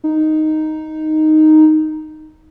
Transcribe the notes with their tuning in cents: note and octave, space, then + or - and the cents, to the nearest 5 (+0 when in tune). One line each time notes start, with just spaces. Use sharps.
D#4 +0